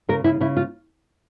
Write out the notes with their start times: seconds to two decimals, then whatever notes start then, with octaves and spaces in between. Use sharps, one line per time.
0.09 C#3 A#4
0.24 C#3 E4
0.41 C#3 E4
0.57 F4